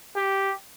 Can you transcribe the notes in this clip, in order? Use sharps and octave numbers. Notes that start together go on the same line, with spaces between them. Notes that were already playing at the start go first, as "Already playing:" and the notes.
G4